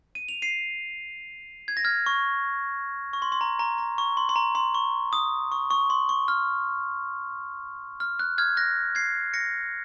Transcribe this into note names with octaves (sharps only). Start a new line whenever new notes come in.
D#7
F7
C7 D#7
G#6
A#6
F6 G#6
C#6
C#6
C6
C6
A#5
A#5
A#5
C#6
C6
C6
A#5
C6
C#6
D#6
C#6
C#6
C6
C#6
F6
F6
F#6
F6 G#6
F#6 A#6
G#6 C7
A#6 C#7